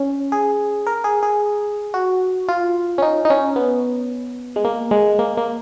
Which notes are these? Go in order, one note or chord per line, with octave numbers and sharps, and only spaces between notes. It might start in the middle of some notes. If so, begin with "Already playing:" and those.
Already playing: C#4
G#4
A#4
G#4
G#4
F#4
F4
C#4
D#4
D#4
C#4
B3
G#3
A#3
G#3
A#3
A#3